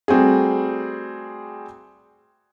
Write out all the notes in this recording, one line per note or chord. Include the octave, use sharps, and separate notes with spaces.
G3 A3 C4 F#4 G#4